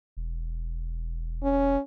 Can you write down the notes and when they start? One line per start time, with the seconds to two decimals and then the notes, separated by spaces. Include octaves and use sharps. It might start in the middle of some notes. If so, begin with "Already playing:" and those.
0.17 E1
1.43 C#4